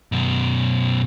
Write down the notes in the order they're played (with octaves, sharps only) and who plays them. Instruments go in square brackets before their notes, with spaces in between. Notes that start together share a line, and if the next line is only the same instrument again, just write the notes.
[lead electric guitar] F#2 B2